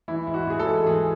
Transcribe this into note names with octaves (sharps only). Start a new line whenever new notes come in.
E3 E4
G#2 E4
F#4
E3 G#4
A4
G#2
E3 G#4